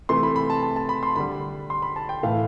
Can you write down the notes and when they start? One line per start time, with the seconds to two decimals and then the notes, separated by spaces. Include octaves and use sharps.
0.09 C3 E3 A3 C6
0.23 B5
0.36 B5
0.50 A5
0.63 A5
0.76 A5
0.89 B5
1.03 C6
1.16 D3 G3 B5
1.70 C6
1.82 B5
1.96 A5
2.09 G5
2.23 A2 E3 A3 F5